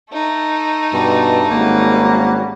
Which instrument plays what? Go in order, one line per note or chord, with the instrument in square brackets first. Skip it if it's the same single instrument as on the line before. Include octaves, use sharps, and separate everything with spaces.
[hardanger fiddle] A3 D#4
[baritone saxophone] G2 [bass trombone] B2
[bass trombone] G#1 [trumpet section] G3 C#4 F#4 [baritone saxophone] A#3